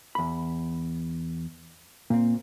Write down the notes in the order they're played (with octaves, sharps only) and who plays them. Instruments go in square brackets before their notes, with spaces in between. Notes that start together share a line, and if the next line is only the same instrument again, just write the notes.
[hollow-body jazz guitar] E2 B5
[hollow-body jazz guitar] A#2 C4 [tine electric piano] A#3